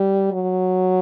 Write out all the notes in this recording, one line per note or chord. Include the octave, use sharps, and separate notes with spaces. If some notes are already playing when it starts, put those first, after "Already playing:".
Already playing: G3
F#3